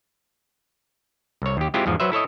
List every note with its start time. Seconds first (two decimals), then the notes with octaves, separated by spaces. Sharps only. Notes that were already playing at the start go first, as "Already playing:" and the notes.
1.42 C2 C#5
1.57 D#2 G4
1.74 G#3 C4 E4 F4 G4
1.86 E2 G#2 F3
2.00 F#3 B4 C5 E5
2.12 E4 A4 C#5 D#5